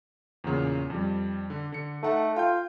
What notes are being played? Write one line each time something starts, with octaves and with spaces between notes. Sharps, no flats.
E2 A#2 C#3
F2 G3
D3
D3 C#7
A3 D#4 F#5 A5
F4 G5 G6